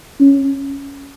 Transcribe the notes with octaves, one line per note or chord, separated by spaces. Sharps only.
C#4